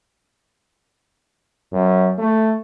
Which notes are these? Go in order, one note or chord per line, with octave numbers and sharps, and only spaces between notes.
F#2
A3